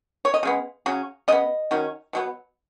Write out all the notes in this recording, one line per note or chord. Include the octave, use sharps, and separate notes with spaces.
C#5
D#5
C#3 G#3 B3
C#3 F#3 C#4
C#3 B3 D#5
D#3 F#3 C#4
B2 F#3 B3